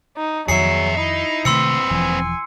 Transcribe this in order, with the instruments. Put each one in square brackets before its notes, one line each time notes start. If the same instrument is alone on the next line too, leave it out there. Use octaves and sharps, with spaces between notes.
[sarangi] D#4
[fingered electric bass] F2 D#3 [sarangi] F#3 [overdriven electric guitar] G#4 E5 [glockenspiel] C7 C#7
[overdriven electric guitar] D#4 [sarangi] E4
[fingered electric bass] C3 D#3 A3 [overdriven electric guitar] C4 B4 [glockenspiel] C6 E6 C#7
[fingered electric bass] E1 E3 F3 [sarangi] G#5